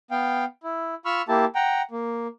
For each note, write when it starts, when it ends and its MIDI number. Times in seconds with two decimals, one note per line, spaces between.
0.11 0.45 59
0.11 0.45 77
0.11 0.45 79
0.63 0.95 64
1.05 1.22 65
1.05 1.22 83
1.05 1.22 85
1.05 1.22 88
1.05 1.22 89
1.28 1.45 58
1.28 1.45 64
1.28 1.45 67
1.28 1.45 81
1.55 1.82 78
1.55 1.82 79
1.55 1.82 82
1.91 2.27 58